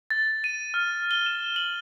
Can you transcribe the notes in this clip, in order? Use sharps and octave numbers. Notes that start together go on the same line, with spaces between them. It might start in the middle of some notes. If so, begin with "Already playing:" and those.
A6
D#7
F6
G7
E7
F#7